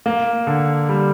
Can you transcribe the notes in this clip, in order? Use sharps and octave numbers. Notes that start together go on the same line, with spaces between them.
A#3
D3
G3